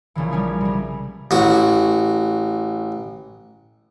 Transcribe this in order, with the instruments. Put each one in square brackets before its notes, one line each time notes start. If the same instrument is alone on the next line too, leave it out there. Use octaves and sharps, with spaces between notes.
[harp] A#1 C#3 E3
G3 C#4 G#4
C3 G3
[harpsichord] A1 F#4